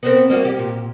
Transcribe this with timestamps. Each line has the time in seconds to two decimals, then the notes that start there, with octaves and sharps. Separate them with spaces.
0.03 B3 C4 A#4
0.30 G3 A#3 F#4
0.45 G4
0.59 A#2